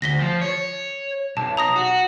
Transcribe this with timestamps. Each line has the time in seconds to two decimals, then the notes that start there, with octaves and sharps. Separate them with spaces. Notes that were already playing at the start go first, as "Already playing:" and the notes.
0.02 D2 A#6 B6 G7
0.20 F3
0.41 C#5
1.37 B1 A5
1.57 A#5 D#6 A#6
1.76 F#4